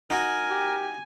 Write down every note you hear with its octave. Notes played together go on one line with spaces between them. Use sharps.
D#4 F#4 A#4 G#5
G4